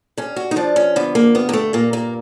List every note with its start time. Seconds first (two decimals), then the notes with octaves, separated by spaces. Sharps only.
0.17 G2 C#4
0.36 F#4
0.51 D#4
0.56 F3 D4
0.76 C#4
0.96 D3 B3
1.15 A#3
1.35 G2 B3
1.49 A#3
1.53 A3
1.73 A#2 A#3
1.93 A#3